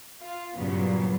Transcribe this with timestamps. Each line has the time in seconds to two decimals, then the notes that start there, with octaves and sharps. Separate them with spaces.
0.20 F4
0.56 G2 A#2 C#3 F#3 B3